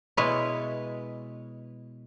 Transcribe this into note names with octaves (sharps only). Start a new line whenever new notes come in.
B2 G#3 E4 B4 C#5